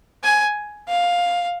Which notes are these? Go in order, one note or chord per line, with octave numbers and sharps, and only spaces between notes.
G#5
F5